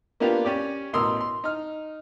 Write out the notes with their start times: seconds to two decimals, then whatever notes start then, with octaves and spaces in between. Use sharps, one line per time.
0.20 A#3 B3 D4 F4 G4 A#4
0.45 C#4 G4 D5
0.93 A1 B2 A#4 C6 D#6 E6
1.21 C6
1.44 D#4 F6